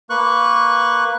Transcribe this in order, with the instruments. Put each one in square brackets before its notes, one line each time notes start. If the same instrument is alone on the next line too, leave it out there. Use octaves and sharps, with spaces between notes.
[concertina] A#3 B4 C#6 F#6